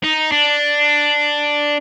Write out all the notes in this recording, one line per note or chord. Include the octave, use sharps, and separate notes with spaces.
D#4
D4